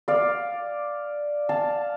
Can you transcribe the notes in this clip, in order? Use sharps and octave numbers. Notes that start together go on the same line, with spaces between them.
D5 F5
F5 A5